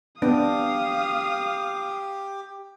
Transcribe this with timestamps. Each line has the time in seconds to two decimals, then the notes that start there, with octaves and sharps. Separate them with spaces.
0.22 B3 D4 G4 F5 D#6